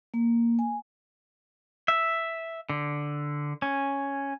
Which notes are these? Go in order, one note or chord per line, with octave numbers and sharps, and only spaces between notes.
A#3
G#5
E5
D3
C#4